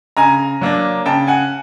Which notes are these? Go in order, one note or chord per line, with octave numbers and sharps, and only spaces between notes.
C#3 G#5 A#5
F#3 A#3 D4
C#3 G5 A5
F#5 G#5